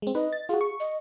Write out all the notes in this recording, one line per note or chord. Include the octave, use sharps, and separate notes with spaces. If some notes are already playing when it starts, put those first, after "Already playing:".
G#3 C4
D#4 B4 D#5
A6
F4 F#4 G#4
C#6
D#5